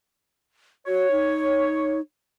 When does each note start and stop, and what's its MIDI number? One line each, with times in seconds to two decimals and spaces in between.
0.87 1.10 66
0.87 1.98 73
1.11 2.01 63